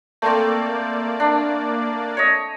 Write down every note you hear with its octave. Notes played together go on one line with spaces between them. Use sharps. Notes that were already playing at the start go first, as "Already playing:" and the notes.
A3 A#3 C4 D5
D4
C#5 D#5